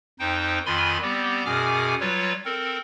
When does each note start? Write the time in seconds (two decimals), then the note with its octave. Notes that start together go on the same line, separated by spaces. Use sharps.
0.19 F2 D#4 C5 G5
0.66 F2 D#3 F4 G#5 B5 C6
1.02 G3 B3 C4 G4
1.45 F#2 B2 G#4 G#5 D6 F6
2.00 F#3 G3 F4 B4 C#5
2.45 C4 A4 A#4